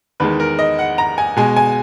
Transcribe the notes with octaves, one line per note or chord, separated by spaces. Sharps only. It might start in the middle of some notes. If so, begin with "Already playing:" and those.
E2 D#3 G#3 B4
A#4
D#5
F#5
A#5
G#5
B2 G#3 G#5
G#5